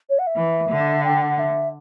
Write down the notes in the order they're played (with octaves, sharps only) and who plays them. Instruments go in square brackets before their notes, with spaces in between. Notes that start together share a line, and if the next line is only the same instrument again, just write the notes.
[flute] C#5
F#5
E5
[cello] E3
D3
[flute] G5
F#5
E5